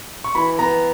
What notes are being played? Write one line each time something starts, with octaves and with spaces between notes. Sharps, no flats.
C#6
E3 B5
B3 A#5